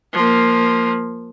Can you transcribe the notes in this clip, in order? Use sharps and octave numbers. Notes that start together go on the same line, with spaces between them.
F3 A#3